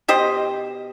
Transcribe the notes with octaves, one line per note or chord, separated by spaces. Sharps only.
B2 G4 C5 D#5